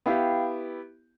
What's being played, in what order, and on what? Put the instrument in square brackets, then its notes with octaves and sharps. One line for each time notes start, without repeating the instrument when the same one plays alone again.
[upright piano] B3 E4 G4 [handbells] F5 G5